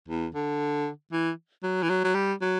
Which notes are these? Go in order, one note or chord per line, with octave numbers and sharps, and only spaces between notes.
E2
D3
E3
F#3
E3
F#3
F#3
G3
F#3